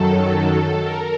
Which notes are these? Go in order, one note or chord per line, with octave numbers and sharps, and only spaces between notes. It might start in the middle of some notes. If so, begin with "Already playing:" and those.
Already playing: F#2 D#3 F#3 A4
A#4